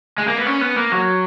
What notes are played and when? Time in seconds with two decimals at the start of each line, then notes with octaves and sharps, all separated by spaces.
0.18 G#3
0.28 A#3
0.37 B3
0.47 C#4
0.61 B3
0.76 A#3
0.92 F#3